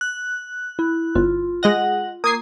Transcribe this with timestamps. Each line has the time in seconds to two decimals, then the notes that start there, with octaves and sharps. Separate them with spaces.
0.01 F#6
0.79 E4
1.15 G1 F4
1.63 G#3 D#5 F#5 A#6
2.24 A#3 D#6 G#6 C7